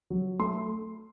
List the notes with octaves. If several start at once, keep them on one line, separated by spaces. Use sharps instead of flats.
F#3
A3 C6